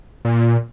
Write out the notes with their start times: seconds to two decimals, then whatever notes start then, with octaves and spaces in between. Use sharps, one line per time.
0.25 A#2